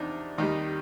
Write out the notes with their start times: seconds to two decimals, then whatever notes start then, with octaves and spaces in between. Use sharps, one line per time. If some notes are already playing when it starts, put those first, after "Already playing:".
Already playing: E2 C3 F3 D4 D#4
0.38 D#2 D#3 G3 D#4